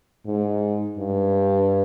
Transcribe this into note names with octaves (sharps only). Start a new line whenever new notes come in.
G#2
G2